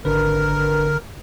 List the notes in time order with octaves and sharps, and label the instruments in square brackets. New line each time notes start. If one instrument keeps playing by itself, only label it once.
[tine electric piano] G#1 D4 B4 [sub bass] D3 [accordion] A#4